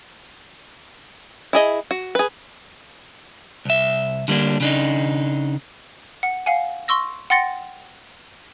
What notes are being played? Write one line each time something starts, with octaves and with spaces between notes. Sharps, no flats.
E4 G#4 D#5
F#4
G#4 B4
C2 E5
D3 G3 A#3 D4
C#3 D4 D#4
F#5
F5 F#5 G#5
C6 C#6 E6 A#6
F#5 G5 C6 A6 A#6 C#7